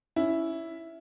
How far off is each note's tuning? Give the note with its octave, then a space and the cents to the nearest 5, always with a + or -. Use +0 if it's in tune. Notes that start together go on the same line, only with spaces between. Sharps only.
C#4 +15 E4 +0